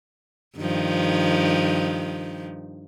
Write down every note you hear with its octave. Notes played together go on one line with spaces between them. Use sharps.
G2 D#3 F3